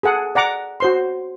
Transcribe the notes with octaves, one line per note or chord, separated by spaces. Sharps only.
G#4 A4 F#5
D5 F#5 A#5 D6
F#4 C5 C6